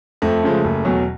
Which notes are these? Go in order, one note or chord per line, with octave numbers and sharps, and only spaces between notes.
F2 A3
C#3 F3 G#3
F#1
E2 B2 F#3